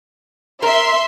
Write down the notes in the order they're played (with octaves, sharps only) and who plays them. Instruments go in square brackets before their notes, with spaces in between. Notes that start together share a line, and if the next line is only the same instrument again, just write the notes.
[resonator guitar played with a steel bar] A#4 [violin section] E5 C6